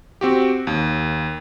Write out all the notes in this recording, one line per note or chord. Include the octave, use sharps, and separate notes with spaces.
C4 F#4 G4
D#2